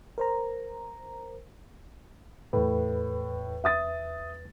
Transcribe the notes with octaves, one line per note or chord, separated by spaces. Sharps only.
A#4 C5 A#5
E2 A2 B4
E5 D#6 A6